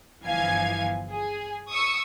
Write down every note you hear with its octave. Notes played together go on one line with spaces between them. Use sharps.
G1 E3 F3 F5 G#5 G#6
G#4
C#6 D#6 E6 C#7